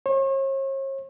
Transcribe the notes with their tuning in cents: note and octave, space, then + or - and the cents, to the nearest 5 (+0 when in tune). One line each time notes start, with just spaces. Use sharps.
C#5 -45